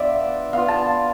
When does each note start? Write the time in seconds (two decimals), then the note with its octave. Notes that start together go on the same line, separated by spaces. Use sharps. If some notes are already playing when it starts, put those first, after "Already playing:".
Already playing: B3 D4 F4 D5 E5
0.53 B3 F4 F5
0.68 A5